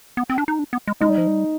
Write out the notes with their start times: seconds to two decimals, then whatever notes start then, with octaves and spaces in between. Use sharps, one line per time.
0.17 B3
0.30 C4
0.38 D4
0.48 D#4
0.59 D4
0.73 B3
0.87 G#3
1.01 G#3 D#4
1.09 G3
1.18 F3
1.27 G3